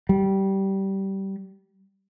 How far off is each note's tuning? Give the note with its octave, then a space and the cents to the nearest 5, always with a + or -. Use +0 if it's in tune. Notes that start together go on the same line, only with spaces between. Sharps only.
G3 -20